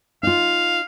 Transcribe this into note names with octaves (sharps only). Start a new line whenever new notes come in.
D#4 F4 F5